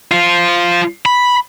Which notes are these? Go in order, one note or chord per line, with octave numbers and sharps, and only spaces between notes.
F3 F4
B5